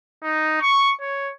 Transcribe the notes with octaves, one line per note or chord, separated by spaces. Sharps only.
D#4
C#6
C#5